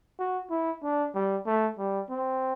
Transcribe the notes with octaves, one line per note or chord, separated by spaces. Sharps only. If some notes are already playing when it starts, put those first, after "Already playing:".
F#4
E4
D4
G3
A3
G3
C4